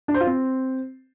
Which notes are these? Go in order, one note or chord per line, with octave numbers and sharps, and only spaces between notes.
D4
C5
F4
C4